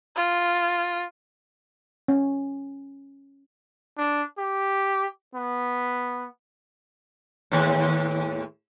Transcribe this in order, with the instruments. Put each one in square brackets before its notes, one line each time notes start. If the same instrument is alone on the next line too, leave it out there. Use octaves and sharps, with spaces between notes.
[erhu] F4
[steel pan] C#4
[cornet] D4
G4
B3
[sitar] D#2 A2